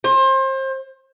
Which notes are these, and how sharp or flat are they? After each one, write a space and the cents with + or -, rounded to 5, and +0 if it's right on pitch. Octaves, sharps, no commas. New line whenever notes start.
C5 +30